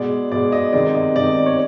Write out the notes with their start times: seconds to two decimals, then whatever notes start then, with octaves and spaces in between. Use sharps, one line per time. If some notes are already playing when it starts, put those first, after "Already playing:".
Already playing: B2 G#3 D5
0.32 B2 G#3 D5
0.52 D#5
0.73 C3 D#3 G#3 D5
0.95 D#5
1.15 C3 D#3 G#3 D5
1.25 D#5
1.46 C#5